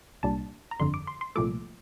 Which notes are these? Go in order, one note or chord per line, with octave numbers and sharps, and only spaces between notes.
C2 A#2 G3 D4 A5
A#5
G1 F2 D3 C6
D6
C6
C6
C2 A#2 F3 A3 D6